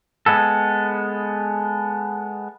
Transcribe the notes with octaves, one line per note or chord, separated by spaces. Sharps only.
G#3 B3 A4